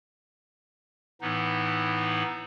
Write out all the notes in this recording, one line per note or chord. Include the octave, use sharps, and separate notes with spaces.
A2 E3 B3 D#4